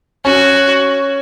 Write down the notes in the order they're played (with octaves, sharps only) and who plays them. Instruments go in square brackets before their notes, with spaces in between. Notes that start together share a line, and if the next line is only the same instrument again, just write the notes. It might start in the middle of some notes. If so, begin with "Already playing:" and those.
[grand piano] C#4 [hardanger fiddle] F#4